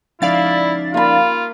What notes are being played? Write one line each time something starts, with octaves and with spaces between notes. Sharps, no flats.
F3 C#4 D#4 E4 D5 F5 A6
A#3 F4 B5